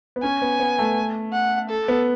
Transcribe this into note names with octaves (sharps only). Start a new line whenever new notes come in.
B3
C#4 G#5
B3
B3
A3
F#5
A4
B3